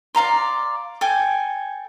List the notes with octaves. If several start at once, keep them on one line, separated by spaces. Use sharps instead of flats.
D5 F5 A#5 C6
A4 G5 G#5